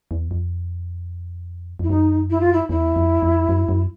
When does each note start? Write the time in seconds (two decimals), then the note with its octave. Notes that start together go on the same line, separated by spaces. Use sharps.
0.11 E2
0.31 F2
1.79 F2 E4
1.89 F#2 D#4
2.30 E4
2.40 F4
2.53 E4
2.69 E2 E4
2.96 F2
3.22 F2
3.49 F#2
3.69 F#2